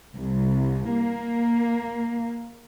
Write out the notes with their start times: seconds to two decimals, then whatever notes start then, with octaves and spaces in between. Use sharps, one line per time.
0.15 C2
0.94 A#3